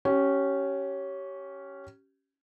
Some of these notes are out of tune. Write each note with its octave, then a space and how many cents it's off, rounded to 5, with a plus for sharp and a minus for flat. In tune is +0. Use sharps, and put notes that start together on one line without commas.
C#4 +0 G4 -25